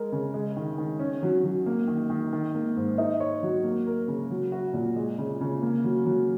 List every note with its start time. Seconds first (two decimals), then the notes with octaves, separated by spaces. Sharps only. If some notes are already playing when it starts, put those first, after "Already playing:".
Already playing: G#3 A#4
0.12 C#3
0.34 G#3
0.57 D#3
0.78 D#3
0.99 C#4
1.23 F#3
1.44 F#3
1.66 A#3
1.87 D#3
2.10 D#3
2.33 D#3
2.55 A#3
2.76 G#2
2.98 D#4
3.20 C#5
3.43 F#3
3.64 A#3
3.87 A#4
4.08 C#3
4.30 F#3
4.52 F#4
4.74 A#2
4.96 G#3
5.18 C#3
5.41 C#3
5.62 A#3
5.84 F#3
6.06 F#3